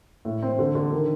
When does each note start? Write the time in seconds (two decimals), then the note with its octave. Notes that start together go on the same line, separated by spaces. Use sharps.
0.25 A2
0.43 C4
0.59 D3
0.75 D3
0.93 D#3